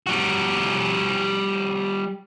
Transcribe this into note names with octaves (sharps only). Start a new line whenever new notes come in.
G3 F#4